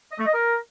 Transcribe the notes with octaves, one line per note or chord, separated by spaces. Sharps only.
D#5
A3
D#5
A#4